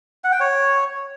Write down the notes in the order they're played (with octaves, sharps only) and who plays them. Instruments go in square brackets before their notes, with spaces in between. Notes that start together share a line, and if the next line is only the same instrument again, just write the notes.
[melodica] F#5
G5
C#5